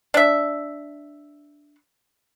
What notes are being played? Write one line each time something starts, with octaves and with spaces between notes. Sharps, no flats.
D4 E5